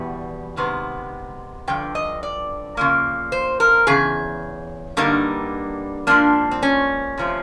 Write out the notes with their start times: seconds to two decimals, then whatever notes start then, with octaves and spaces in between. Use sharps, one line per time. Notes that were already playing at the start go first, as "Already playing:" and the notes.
Already playing: E2 B2 G3 B3
0.57 C3 D#3 G#3 B3
1.68 G2 D3 F3 G5
1.95 D#5
2.23 D5
2.77 C#3 F3 A#3
3.32 C5
3.60 A#4
3.87 E2 C#3 G#4
4.97 G2 D3 G3 A#3 D#4
6.07 G#2 F3 A#3 D4
6.51 C4
6.63 C#4
7.18 C3 F3 A3